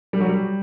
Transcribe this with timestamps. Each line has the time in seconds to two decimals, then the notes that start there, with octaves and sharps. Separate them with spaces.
0.13 G3
0.20 F#3
0.28 G3